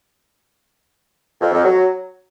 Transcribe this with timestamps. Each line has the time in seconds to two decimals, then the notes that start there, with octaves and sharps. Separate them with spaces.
1.41 F2
1.53 F2
1.64 F#3